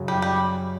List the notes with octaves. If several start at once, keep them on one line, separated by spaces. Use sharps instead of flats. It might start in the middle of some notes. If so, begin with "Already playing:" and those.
Already playing: F#2 C#3 F#3
G3
G3